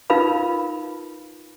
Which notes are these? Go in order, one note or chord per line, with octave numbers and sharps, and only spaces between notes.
D#4 F4 A#4 B4 F5 B5